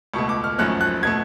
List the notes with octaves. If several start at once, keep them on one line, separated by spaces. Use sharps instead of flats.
C#2 B2 A3 C#6
D6
F6
G#1 F#2 F3 A3 C#4 F#6
F#6
B2 A3 G#6